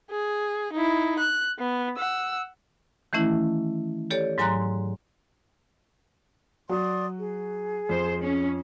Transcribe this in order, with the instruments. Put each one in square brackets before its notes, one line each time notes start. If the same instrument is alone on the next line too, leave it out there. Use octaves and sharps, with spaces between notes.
[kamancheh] G#4
D#4 E4
F#6
B3
F#5 E6
[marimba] D#3 E3 A3 C#4 E4
G4 A4 C#5 D5
G#2 F#3 G#5 A#5 C6 F#6
[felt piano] F#3 F#4 [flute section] D5 C6 D#6
[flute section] G#4
[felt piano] F2 [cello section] C5
[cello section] C#4